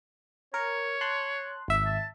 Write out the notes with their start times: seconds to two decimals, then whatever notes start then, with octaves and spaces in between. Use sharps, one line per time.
0.54 A#4 C#5
1.01 A5 C6 F#6
1.68 G#1 E5
1.85 A5